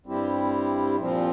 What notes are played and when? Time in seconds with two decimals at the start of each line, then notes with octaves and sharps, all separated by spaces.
0.06 G2 G3 C4 E4 G4
0.96 A#2 F3 C4